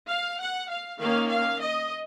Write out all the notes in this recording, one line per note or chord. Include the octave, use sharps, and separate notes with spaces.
F5
F#5
F5
D#3 A#3 C#4 F5
F5
D#5